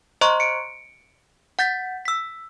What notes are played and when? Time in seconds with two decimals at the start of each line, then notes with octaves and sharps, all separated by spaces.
0.21 C5 D#5 A#5 C6 C#6 F#6
0.40 C#7 D7
1.59 F#5 G6 A6 B6
2.05 E6 B6